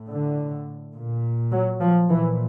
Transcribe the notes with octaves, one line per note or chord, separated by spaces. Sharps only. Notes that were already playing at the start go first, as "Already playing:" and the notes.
Already playing: A2
D3
A#2
F#3
F3
A#2 E3